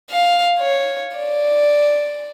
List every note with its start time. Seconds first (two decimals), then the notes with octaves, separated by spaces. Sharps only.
0.11 F5
0.59 C#5
1.17 D5